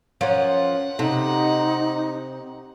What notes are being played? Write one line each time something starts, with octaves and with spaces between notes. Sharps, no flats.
F3 C#4 A#4 C#5 F#5
C3 D#4 A4